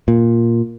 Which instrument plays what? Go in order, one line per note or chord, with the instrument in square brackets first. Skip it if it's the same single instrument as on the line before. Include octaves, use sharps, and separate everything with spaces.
[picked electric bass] A#2